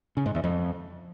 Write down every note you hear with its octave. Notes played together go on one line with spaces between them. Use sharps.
C#3
G#2
E2
F2